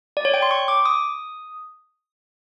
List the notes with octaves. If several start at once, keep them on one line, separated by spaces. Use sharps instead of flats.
D5
C#5
G5
C6
C#6
D6
D#6